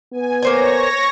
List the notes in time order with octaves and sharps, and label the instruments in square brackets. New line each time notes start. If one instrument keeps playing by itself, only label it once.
[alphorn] B3 [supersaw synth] G#5
[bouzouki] A#3 C5 G#5 [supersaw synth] C#5 A#6